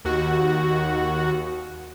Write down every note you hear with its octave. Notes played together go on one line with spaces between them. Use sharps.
D#2 F#4